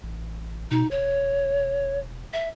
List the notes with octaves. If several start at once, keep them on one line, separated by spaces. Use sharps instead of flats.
A1
B2 D#4
E1 C#5
E5